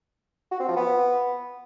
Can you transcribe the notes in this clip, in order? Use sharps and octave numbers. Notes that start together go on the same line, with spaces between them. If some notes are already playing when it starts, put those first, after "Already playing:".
F#4
C4
F3
B3